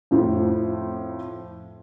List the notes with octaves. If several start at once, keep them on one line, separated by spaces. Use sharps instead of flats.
F2 A2 F3